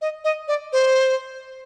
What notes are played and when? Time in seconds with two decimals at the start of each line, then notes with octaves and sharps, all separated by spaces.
0.01 D#5
0.24 D#5
0.48 D5
0.73 C5